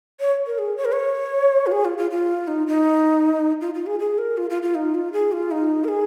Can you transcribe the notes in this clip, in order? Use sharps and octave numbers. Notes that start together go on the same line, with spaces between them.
C#5
A#4
G#4
C#5
A#4
C#5
F4
G#4
F4
F4
F4
D#4
D#4
F4
F4
G#4
G#4
A#4
F4
F4
F4
D#4
F4
G#4
F4
D#4
A#4
G#4